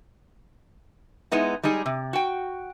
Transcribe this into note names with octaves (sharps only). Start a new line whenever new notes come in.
G#3 B3 D#4 E4
G3 G#3 D#4 G#4
C3
F#4 G5